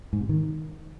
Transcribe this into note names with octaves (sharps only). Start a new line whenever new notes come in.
G#2
C3
D#3